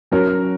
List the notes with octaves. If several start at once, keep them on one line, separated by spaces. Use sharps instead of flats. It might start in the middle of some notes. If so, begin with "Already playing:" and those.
F#3 C#4 F#4 A#4 C#5